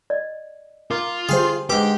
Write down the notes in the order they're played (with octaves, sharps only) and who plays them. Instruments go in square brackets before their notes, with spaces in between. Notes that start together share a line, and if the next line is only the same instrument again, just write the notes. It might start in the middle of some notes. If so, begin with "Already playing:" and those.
[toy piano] D5 D#5
[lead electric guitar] F4 [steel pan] A#4 [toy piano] D6
[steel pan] D3 G3 C5 [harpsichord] G#4 F5 [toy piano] G5
[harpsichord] G#2 D6 [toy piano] D4 B4 [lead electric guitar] G4